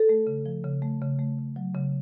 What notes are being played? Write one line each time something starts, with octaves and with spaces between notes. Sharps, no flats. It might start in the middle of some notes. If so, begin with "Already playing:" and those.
Already playing: A4
A3
C#3
F3
C#3
A3
C#3
A3
C#3
F#3
C#3